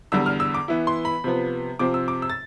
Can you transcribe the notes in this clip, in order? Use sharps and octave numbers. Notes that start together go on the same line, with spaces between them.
E2 D3 G3 E6
F6
E6
D6
E3 B3 E4
C6
B5
C3 F3 B3
C3 F3 C4 D6
E6
D6
E6
A6